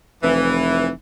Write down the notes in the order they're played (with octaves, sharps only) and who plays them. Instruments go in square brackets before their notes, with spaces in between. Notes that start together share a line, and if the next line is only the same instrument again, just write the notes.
[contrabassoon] F1 [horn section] E3